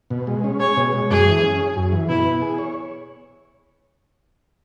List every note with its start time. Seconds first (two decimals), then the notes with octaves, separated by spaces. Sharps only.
0.10 B2
0.27 G#3
0.44 C#4
0.60 G#4 C#5
0.77 B2
0.93 G#3
1.10 F#2 G#4
1.26 E3
1.43 C#4
1.59 G#4
1.76 F#2
1.92 E3
2.09 B2 E4
2.26 B3
2.42 G#4
2.58 C#5